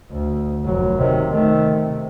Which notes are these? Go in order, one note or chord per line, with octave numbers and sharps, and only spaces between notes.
D2
F1 F#3
C3 D#3
D#3 A3
C3